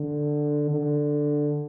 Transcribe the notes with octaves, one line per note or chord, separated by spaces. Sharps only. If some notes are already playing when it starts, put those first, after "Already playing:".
Already playing: D3
D3